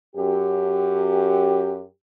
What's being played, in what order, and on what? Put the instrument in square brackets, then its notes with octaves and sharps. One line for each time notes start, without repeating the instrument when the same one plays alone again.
[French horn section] F#2 G4